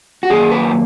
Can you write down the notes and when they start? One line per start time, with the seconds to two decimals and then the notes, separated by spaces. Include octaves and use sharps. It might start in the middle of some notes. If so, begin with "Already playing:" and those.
0.23 F#4
0.30 F#2 D#3 A#3 G#4
0.51 B4